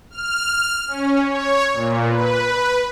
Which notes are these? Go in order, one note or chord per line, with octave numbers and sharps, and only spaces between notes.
F6
C#4
C#5
A#2
B4